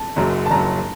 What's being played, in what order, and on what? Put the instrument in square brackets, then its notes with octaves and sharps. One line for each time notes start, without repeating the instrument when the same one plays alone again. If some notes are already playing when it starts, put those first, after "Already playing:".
Already playing: [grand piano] A5
[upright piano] F#1 F#2 F#3
[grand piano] A5
[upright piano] F#1 F#2 F#3 [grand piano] A#5